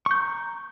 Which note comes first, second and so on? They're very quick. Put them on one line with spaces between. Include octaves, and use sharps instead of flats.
C#6 G6 A#5